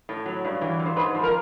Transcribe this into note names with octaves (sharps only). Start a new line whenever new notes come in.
A2
F#3
G2
E3
G2
C5
G#2 B4
F3
A#4